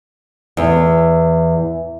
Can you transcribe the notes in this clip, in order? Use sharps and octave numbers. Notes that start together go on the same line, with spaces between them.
E2